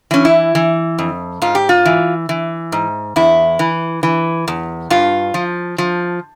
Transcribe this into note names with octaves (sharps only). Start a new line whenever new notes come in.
E3 C#4
E4
E3
F2
G#2 F4
G4
F4
E3
E3
G#2
E2 E4
E3
E3
E2
G2 F4
F3
F3